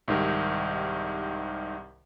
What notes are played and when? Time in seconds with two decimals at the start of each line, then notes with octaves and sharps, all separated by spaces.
0.08 C2 G#2 D#3 G4 A#4